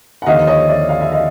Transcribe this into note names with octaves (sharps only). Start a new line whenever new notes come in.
F#5
D#2 D3 F3 D#5 F5
C#5 D#5
D5 E5
F5
E5
D#5 F5